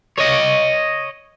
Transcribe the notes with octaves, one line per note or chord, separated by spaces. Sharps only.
C#5 D#5